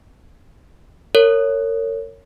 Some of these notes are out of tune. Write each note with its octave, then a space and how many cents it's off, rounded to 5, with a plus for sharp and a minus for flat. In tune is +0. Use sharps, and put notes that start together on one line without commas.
A#4 -35 C#5 +0